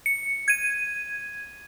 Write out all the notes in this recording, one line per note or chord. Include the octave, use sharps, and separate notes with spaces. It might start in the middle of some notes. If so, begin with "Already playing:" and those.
C#7
G#6 D#7